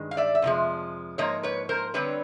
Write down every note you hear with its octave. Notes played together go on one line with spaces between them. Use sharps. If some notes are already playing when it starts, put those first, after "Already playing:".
Already playing: G2 D#3 G#3
F5
D5 E5
E5
F2 C3 F3 G#3
G#2 F3 A#3 C#5 D#5
B4 C#5
A#4 C5
D3 G3 C4 B4 C#5